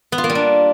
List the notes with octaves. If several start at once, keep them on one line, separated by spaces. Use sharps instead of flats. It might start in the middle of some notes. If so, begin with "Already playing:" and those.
B3
F4
A#3
G3
D4